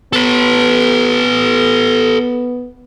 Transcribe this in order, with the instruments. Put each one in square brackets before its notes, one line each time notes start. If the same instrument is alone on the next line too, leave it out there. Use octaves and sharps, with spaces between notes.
[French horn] B3 [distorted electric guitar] A4 B4